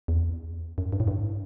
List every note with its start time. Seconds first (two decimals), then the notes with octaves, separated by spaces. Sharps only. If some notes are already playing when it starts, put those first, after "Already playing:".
0.08 E2
0.78 F#2
0.92 G2
1.00 A2
1.07 G2